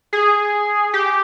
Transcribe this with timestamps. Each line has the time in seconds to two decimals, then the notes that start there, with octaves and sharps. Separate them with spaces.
0.13 G#4
0.93 G4